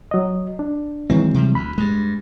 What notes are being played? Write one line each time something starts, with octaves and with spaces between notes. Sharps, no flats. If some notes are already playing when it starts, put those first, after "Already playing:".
F#3 D#5
D4
D#3 E3 F#3 G#3 C4
C3 G3
D2 B5
G2 G#3